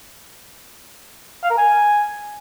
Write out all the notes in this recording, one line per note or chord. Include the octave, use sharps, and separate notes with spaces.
F5
A#4
G#5